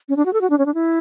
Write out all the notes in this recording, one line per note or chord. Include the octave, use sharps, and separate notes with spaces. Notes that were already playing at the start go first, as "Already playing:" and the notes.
C#4
D4
F#4
A4
F#4
D4
C#4
D4
E4